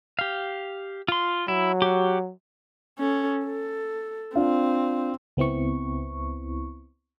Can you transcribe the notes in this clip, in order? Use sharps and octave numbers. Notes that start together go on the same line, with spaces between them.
G4 F5
F4 C6
F#3 E4
F#4 G4
C#4 A4
A4
C4 D4 F4
C#2 B3 C4 E4 C#6